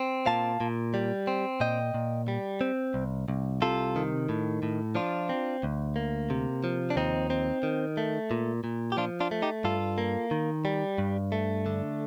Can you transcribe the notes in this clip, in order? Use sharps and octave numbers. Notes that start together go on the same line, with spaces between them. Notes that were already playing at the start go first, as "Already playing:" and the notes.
Already playing: C4
A#2 F5 A5
A#2
G3
C4
A#2 D#5 G5
A#2
G3
C4
C2
C2
C3 F4 A4
D#3
A2
A2
F3 D4 F4
C4
D2
A#3
C3
F3
D4
D#2 C4 D#4
C4
D#3
A3
A#2
A#2
G4
F3 D4 F4
D4 F4
A3
D#4 G4
G2 F4 A4
A#3
D#3
G3
G2
A3
D3